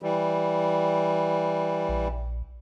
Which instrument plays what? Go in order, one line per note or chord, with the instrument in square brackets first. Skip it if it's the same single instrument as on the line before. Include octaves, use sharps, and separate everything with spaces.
[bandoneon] E3 G3
[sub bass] A#1